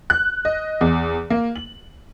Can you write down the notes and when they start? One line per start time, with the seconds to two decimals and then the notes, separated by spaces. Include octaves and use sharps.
0.10 F#6
0.45 D#5
0.81 E2
1.30 A#3
1.56 F#7